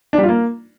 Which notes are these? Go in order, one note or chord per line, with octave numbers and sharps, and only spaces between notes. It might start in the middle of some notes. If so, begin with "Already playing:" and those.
D4
G3
F4
A#3